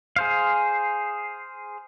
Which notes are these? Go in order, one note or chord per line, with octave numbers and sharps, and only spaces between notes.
G#4 C5 F5